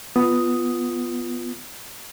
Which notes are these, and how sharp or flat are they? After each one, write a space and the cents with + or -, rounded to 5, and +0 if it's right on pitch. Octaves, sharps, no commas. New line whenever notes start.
B3 +0 F4 -5 D#6 +0